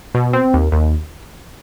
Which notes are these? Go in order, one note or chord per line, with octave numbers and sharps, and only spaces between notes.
B2
C4
D#2
D#2